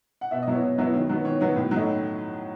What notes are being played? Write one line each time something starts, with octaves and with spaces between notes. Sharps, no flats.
F#5
B2 E5
D#5
F#3 B3 E4 C#5
B2
F#3 B3 E4
D#3
F#3 B3
D#3 C#5
F#3 B3
A2
F#3 A3 D#4